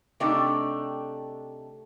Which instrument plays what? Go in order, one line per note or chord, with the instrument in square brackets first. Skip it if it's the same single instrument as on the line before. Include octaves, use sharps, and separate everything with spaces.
[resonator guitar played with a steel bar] C3 A3 D4 D#4 G4 A4